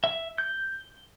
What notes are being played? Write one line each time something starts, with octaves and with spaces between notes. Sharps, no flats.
E5
G6